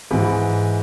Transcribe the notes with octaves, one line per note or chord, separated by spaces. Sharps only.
G#2 E3 B5